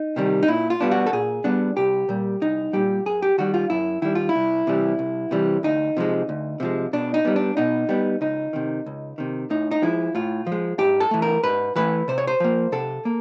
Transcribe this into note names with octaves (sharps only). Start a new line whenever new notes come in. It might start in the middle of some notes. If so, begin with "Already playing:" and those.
Already playing: D#4
C3 D#3 G3
D#4
A#2 E4
F4
G3 B3 D4
F#4
A4
A#2 G#4
G3 B3 D4
C2 G4
A#2 G3
C2 D#4
A#2 G3 G4
F#2 G#4
G4
D#3 G3 F#4
F4
F#2 E4
D#3 G3 E4
F4
E4
C2
C3 E3 G3
C2
C3 E3 G3
D2 D#4
C3 F3 G#3
D2
C3 F3 G#3
B2 D4
D#4
G3 B3
D4
B2 D#4
G3 B3
C#2 D#4
C3 D#3
C#2
C3 D#3
A2 D#4
D#4
F3 G#3 E4
A2 F4
F3
G#3
G#2 G4
A4
E3 A3
A#4
G#2 B4
E3 A3 B4
C3 C5
C#5
C5
F3 A#3
C3 A4
A#3